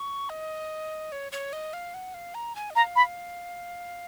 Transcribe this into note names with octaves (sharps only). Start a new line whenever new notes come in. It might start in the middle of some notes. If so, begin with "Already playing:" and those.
Already playing: C#6
D#5
C#5
C#5
D#5
F5
F#5
F5
A#5
G#5
D#5
F5 A#5
B5